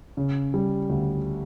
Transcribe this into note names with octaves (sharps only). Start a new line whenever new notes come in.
C#3
G3
D2